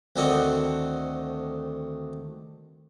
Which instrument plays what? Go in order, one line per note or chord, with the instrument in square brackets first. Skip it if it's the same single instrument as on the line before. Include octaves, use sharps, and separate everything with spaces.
[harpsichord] D2 D#3 C4 D4 D#4 F#5